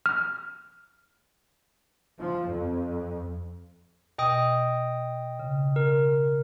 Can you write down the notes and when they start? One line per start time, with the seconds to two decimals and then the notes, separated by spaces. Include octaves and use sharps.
0.06 F6
2.20 F3
2.49 F2
4.18 B2 D#5 G5 D#6
5.39 C#3
5.76 A#4